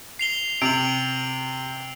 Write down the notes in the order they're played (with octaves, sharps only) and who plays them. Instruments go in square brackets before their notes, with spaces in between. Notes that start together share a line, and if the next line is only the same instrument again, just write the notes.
[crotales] C7 F7 G7
[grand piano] C3 [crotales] D7 F7 F#7